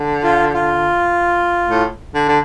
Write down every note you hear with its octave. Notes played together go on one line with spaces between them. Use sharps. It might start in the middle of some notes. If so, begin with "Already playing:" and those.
Already playing: D3
F4
F4
A2
D3
D3